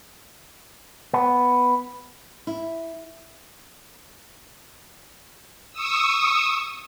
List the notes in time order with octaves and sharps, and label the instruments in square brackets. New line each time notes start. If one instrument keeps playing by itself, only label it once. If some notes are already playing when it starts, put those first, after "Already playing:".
[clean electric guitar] B3
[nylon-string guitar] E4
[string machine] C#6 D#6 E6